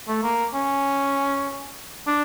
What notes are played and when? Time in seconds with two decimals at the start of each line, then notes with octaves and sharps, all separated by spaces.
0.08 A3
0.23 A#3
0.54 C#4
2.07 D4